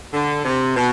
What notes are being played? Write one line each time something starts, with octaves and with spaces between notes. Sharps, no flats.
D3
C3
B2